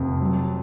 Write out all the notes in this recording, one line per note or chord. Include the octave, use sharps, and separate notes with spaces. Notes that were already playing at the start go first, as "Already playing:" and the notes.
Already playing: F1 F2
F#3